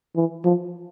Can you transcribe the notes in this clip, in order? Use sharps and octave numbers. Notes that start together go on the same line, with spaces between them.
E3
F3